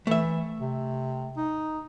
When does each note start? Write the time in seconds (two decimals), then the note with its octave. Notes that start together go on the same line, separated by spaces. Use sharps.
0.07 E3 A3 E5
0.61 C3
1.37 D#4